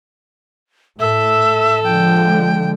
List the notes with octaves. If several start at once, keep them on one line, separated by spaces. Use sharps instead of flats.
A2 A4 E5
D3 F3 G#3 G5